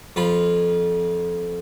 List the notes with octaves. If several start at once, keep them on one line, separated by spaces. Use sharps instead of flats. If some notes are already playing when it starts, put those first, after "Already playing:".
F2 F4 B5